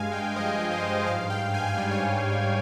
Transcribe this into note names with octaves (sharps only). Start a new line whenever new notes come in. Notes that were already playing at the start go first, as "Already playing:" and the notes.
Already playing: G2 G#3 F5 G#5
G#3 G5
F3 D#5
F3
C5
G2
G#2 F5
G#2 G5
G#2 G#5
G#5
G3 G5
C#5